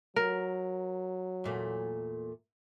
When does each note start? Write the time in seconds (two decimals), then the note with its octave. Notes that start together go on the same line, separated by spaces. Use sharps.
0.16 F#3 A#4
1.44 E2 A#2 A3